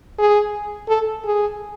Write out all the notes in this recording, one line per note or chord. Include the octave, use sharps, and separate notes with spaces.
G#4
A4
G#4